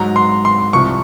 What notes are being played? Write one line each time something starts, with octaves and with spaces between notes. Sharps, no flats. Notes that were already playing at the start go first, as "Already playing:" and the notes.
Already playing: G#2 F#3 A#5
C6
C6
C2 C3 F3 C#6